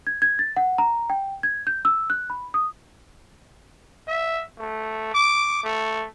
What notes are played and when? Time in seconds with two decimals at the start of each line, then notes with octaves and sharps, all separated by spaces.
0.07 G#6
0.22 G#6
0.39 A6
0.57 F#5
0.78 A#5
1.10 G5
1.43 G#6
1.67 G6
1.85 E6
2.10 F#6
2.30 B5
2.54 D#6
4.07 E5
4.58 A3
5.14 D6
5.63 A3